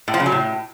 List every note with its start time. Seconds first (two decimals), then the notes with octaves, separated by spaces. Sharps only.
0.08 A2
0.14 F3
0.20 C#3
0.26 F#3
0.32 A2